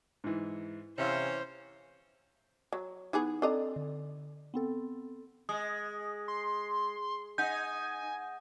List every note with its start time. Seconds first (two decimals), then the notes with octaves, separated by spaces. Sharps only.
0.24 G#2 E3
0.98 C3 E3 C#4 C5 E5 F5
2.73 F#3
3.13 E3 B3 D#4 G#4
3.42 C4 D4 A4 D#5 A#5
3.76 D3
4.54 B3 C4 A4
5.49 G#3 D#6
6.28 C6
7.38 D#4 F#5 G#5 G6